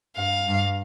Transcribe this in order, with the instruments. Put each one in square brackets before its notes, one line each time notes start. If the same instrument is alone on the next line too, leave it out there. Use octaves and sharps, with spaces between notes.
[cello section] G2 [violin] F5
[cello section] G2